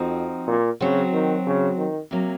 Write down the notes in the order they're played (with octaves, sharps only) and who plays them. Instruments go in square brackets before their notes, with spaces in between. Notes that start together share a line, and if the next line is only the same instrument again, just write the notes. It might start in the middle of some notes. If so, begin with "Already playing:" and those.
Already playing: [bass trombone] F2 [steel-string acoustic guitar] F3 C4 D#4 F#4
[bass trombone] A#2
[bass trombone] C#3 [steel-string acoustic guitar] F#3 C4 F#4
[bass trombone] D#3
C#3
D#3
[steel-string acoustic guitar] C3 F#3 A#3